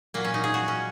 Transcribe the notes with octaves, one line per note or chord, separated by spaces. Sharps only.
A#2 F#3 A#3
C#4
D#4
G#4
F#4
C#4